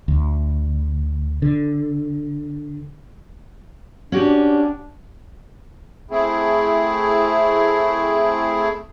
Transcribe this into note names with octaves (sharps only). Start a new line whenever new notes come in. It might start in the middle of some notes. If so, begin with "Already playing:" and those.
D2
D3
C#4 D4 F#4 G4
A3 C4 E4 G#4